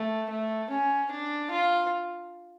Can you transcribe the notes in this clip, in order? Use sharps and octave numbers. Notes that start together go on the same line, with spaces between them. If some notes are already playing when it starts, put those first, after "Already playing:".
Already playing: A3
A3
C#4
D4
F4